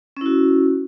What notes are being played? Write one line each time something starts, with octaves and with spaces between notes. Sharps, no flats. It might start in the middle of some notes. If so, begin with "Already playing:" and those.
C#4 E4 F#4